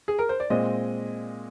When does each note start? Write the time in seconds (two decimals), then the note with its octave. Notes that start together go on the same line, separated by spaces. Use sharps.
0.08 G#4
0.19 A#4
0.29 C5
0.40 D5
0.50 A#2 G#3 C4 D#5